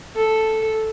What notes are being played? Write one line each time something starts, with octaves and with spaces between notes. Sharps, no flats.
A4